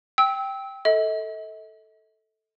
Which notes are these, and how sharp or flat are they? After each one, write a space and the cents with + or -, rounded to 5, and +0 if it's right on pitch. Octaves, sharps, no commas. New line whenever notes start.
G5 +0 E6 -25
A4 +0 D#5 +45